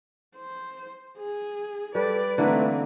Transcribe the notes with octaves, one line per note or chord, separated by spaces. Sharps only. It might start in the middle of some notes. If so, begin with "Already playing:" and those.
C5
G#4
G3 A4 B4 D5
D3 E3 A3 A#3 C4 D#4